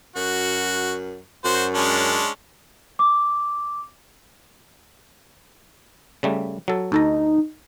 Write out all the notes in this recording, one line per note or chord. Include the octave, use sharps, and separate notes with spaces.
F#2 F#4
F#2 F#4 C5
G#3 C#4 D4
D6
C#3 G3 A3
F#3 A4
D2 D#4 A4 A#5